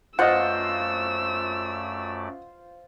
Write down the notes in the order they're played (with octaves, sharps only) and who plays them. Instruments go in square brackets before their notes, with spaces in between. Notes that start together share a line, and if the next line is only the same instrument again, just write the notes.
[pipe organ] F#2 A3 D5 [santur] F4 C5 [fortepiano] D#5 F#5 [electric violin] E6